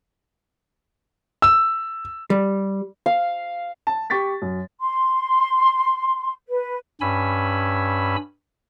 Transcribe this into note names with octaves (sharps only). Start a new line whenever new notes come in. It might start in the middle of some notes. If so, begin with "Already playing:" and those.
E6
G3
F5
A5
G4 C#6 A6 B6
F#2
C6
B4
G2 C#4 G#5 B5 E6